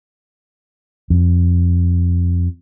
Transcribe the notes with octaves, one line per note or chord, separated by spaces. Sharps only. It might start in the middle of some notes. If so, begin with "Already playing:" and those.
F2